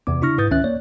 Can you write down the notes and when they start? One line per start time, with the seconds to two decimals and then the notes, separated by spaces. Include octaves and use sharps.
0.07 E2 C3 B3 D6
0.21 C#3 D4 E4 C#6 F6 A#6
0.38 G#2 E4 B4 D#6 G6 A6
0.51 C#2 D#3 C#4 E5 F#6 A6
0.64 A#3 C#5 D5